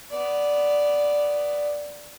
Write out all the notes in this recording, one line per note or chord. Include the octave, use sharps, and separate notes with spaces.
B3 D5